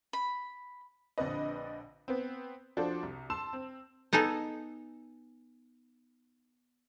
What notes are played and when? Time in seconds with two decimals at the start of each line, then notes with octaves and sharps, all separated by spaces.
0.13 B5
1.18 A#1 D3 C4 D4 B4 D#5
2.08 B3 C4
2.77 F3 D4 F#4 A4 C5
3.02 C2
3.30 A5 C6 E6 E7
3.53 C4
4.13 B3 D#4 G#4 A4